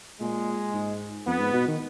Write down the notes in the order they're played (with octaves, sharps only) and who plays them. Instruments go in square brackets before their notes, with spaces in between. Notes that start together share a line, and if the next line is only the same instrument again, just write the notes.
[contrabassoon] A#2 [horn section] G#3
[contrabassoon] G#2
[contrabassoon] F2 [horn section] B3
[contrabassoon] G#2
B2
D#3